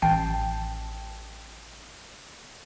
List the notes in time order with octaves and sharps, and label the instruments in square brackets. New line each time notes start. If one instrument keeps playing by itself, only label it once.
[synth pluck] A1 G5 A5 C7